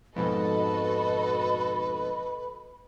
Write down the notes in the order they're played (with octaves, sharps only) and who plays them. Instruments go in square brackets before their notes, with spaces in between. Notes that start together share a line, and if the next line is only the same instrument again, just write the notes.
[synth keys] F2 G#2 B2 [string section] F#4 A4 D#5 [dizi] B4 [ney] B5